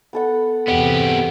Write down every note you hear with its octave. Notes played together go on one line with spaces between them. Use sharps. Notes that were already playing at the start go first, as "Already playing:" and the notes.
B3 A4 F#5
E2 C3 B3 G4 F#5